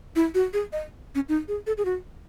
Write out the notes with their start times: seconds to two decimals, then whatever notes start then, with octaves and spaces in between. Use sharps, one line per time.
0.16 E4
0.34 F#4
0.53 G#4
0.73 D#5
1.15 C#4
1.29 D#4
1.48 G#4
1.67 A4
1.78 G#4
1.85 F#4